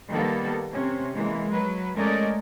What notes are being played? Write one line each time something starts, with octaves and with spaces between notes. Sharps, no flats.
D#3 G3 A#3 B3 A4
C3 C#4
E3 G#3 A#3
F#3 B4
G#3 A3 C#4 A#4 D5 D#5